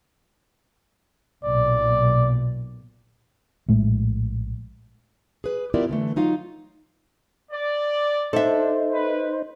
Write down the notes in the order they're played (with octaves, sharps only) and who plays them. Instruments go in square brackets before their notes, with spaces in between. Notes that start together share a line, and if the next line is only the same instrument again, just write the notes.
[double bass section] B1 A#2 [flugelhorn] D5
[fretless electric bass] A#1 A2 G#3 A3
[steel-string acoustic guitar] G#4 B4
B3 E4 F4 G4 A#4 D5
D3 E3 A3
F#3 D#4 F4 F5
[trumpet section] D5
[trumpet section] D4 [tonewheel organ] D#4 C5 [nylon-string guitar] A4 E5
[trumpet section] B4